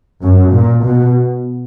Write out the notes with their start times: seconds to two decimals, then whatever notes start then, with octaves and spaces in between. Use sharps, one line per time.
0.24 F#2
0.53 A#2
0.84 B2